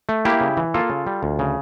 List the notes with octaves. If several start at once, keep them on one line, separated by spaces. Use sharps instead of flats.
A3
A#3 E4 G4
C#3
E3
A#3 F4 A4
C#3
G3
D2
C#3